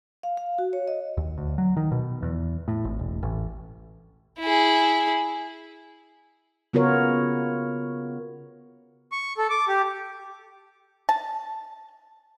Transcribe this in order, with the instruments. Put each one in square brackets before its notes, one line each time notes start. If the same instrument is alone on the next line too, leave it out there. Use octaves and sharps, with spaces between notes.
[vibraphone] F5
F5
F#4
C#5
D#5
[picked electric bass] D#2
D2
F#3
D#3
B2
E2
A2
G#1
E1
A1
[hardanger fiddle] E4 G#4
[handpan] C#3 B3 F4 F#4 A#4 C#5
[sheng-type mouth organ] C#6
A4
D6
G4
[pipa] A5